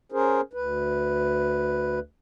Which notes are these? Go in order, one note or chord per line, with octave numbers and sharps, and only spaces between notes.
C#4 G#4 A#4 C5
D2 B4